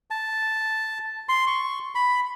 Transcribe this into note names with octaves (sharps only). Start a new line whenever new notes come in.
A5
C6
C#6
B5